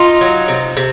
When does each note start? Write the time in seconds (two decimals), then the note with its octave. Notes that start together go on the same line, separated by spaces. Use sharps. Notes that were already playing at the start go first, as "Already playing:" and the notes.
Already playing: D#4 F4
0.21 F#3
0.48 C3
0.77 C3